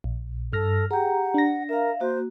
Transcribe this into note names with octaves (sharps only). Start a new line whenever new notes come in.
A#1
G2 A4 F6 A#6
G4 G#4 F#5 G5 A#5
D4 A#6
A#4 E5 F5
A#3 F#4 C5